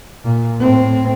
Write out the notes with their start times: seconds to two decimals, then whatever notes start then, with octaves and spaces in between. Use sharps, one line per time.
0.24 A#2
0.60 A2 C4